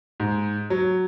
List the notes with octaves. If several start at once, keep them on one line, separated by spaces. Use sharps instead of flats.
G#2
F#3